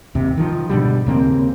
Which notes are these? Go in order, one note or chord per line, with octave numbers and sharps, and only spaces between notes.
D#2 C3
D#3 F3
G#2 B2 D3 G3
D#2 C#3 A#3 C4